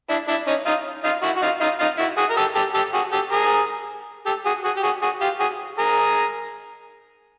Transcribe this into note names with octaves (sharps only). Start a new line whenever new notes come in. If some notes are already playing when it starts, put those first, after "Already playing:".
D4 E4
D4 E4
C#4 D#4
D#4 F4
D#4 F4
E4 F#4
F#4
D#4 F4
D#4 F4
D#4 F4
E4 F#4
F#4 G#4
A#4
G4 A4
G4 A4
G4 A4
F#4 G#4
G4 A4
G#4 A#4
G4 A4
F#4 G#4
F#4 G#4
G4
F#4 G#4
F#4 G#4
F4 G4
F#4 G#4
G#4 A#4